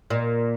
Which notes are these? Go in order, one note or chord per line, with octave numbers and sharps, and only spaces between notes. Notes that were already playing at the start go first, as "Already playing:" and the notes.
A#2